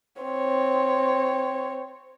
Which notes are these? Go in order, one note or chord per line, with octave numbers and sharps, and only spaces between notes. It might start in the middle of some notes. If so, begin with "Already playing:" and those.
C4 C#5